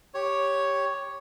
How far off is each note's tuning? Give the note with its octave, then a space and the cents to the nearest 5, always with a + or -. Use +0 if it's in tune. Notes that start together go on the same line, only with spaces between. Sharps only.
G4 +0 C#5 +0